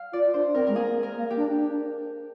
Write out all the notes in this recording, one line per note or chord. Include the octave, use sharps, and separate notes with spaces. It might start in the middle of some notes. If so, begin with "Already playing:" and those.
Already playing: F5
F4 D5
D4 C5
C4 A#4
G#3 A#4
A#3 G#4
A#4
A#3
G4
D4
D4